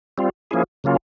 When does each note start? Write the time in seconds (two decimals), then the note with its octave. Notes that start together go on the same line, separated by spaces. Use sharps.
0.18 G3 C4 F4
0.51 F3 A#3 C#4 E4 G#4
0.84 C#3 F#3 A#3 C#4 F4